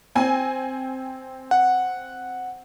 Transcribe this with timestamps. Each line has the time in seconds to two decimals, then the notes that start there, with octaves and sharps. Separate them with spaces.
0.15 C4 G#5
1.51 F#5